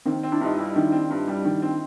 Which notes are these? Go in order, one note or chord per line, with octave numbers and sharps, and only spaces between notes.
D#3 A#3 C4
C4
D4 E4
G2 D#4 F4
G3 D4 E4
D#3
C4
G2
G3
D#3
C4